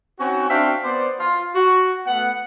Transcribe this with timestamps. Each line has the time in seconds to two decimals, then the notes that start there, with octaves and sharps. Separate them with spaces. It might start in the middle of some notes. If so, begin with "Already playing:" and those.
0.20 C4 C#4 D#4 F#4
0.50 C4 D4 F#4 E5 F5 G5
0.84 B3 C5 D5
1.20 F4
1.55 F#4
2.06 A3 B3 F#5